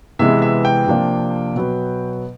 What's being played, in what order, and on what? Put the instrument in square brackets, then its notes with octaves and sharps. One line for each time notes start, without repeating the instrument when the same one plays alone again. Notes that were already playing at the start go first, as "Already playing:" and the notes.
[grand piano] C3 E3 G#3 B3 E5
E5
G5
C3 F3 A#3 D4
B2 F#3 B3